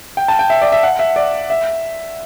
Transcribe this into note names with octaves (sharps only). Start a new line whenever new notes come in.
G5
A5
G5
E5
D5
E5
F#5
E5
D5
E5